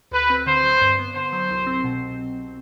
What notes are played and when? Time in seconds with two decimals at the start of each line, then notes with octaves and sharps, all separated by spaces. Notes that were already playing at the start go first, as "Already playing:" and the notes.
0.11 D2 B4
0.30 C4
0.46 D3 C5
0.63 F#3
0.82 G2
0.99 B3
1.15 D3 C5
1.33 F#3
1.51 C2
1.67 C4
1.84 B2